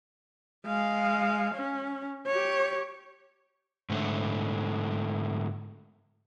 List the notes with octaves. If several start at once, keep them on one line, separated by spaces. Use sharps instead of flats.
G#3 F5
C#4
G4 C#5
G#2 D3 A3